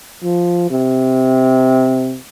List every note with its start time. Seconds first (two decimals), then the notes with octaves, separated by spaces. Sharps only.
0.23 F3
0.71 C3